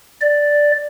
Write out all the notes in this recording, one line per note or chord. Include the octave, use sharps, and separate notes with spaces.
D5